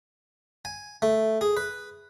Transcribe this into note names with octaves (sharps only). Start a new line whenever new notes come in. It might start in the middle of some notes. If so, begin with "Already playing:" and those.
G#5
A3
G#4
B4